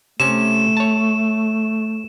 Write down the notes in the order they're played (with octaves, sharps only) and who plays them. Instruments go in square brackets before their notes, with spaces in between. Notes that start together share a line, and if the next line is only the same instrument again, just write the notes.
[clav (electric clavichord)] C3 C#4 [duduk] A3 [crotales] E7
[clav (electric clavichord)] C#5 A5